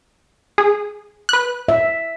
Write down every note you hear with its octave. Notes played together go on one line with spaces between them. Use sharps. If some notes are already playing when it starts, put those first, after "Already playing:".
G#4
B4 F#6
E5